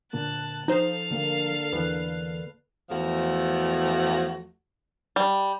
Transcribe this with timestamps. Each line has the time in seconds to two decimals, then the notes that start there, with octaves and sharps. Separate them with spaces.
0.13 A#2 D3 A#3 A5 F#6
0.68 F3 D#4 A4 C5 F5
1.11 D3 A#3
1.73 E2 E3 B4
2.90 E2 F3 A3 F#4
5.16 G3